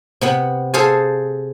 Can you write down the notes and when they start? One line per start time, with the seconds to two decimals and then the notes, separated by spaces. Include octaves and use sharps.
0.21 C3 B3 B5
0.74 G#4 A4 C5 F5 G#5